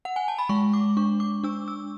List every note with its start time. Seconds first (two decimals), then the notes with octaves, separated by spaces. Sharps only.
0.05 F#5
0.16 G#5
0.28 A5
0.38 B5
0.49 G#3 C#6
0.73 D6
0.97 D4 C#6
1.20 D6
1.44 D4 E6
1.68 E6